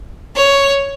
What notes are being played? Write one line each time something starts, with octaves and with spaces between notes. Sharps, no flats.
C#5